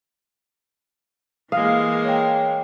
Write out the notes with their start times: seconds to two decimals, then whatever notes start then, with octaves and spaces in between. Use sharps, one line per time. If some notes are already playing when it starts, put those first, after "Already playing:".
1.52 E3 G#3 A#3 F5 D#6
2.05 C#5 G5